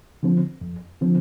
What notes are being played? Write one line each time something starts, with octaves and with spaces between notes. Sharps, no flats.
D3 F3 C4
F2
D3 F3 C4